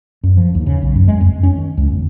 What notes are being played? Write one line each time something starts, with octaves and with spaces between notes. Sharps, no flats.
F#2
F3
D#2
C#3
B1
F#2
G#3
F2
C#4
D#3
C#2
E2